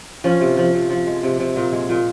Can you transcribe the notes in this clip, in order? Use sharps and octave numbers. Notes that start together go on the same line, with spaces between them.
F3 C#4
C3
F3
C3
F3
G#3
C3
C3
A#2
G#3
A#2